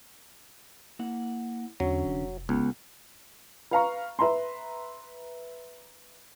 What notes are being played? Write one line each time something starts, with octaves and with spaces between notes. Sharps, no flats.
A#3 E4 F#5
E2 D3 F#3 C#4
F1
C#2 B3
B4 F5 A#5 C#6
B4 E5 A#5 C6